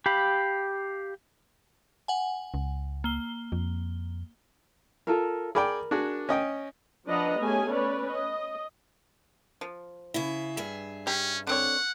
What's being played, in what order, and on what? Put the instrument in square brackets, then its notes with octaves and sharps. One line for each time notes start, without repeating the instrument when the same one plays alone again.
[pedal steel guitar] G4 F5 B5
[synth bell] F#5 G#5
[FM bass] C#2
[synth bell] A#3 G7
[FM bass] F2
[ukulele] F4 A4 A#4
[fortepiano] G#4 D5 G5 [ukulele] A#4 B5
[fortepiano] D4 F#4 G#4
C#4 D#5 G5
[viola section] F3 D4 B4 D#5 F#5 A#5
A3 B3 C#4 G4 G#4 G#5
C#4 B4 C#5 D5
D#5
[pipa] F3
[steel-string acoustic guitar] C#3 E4
G2 G#4 E5
[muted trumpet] C#4 [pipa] G4
[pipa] D3 C4 C#5 [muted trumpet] F#5